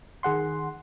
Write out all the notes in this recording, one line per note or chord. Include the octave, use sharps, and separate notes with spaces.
D#3 G#4 F#5 C6